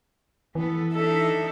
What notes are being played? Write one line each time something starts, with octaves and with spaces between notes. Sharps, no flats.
E3 B3 A4
D4 D#4 A4 E5